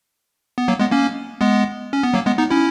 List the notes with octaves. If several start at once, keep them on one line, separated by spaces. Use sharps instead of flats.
B3
F#3 A#3
G#3 B3
A#3 C#4
G#3 B3
C#4
B3
F#3 A#3
G#3 B3
B3 D#4
C#4 E4